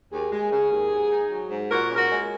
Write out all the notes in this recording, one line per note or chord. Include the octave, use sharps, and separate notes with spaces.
D#2 G#4
G#3
C#3
D#2
G#2
D#4
F#3
G#2
A#2 F#4 A#4
C#4
F#4 A#4
G#3